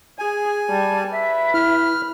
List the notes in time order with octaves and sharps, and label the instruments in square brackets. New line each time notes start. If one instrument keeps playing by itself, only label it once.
[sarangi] G#4 [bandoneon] G#5
[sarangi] G3 [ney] A5
[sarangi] B4 [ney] E5
[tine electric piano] E4 [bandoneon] F6